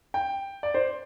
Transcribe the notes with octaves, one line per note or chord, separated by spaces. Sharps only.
G5
D5
C5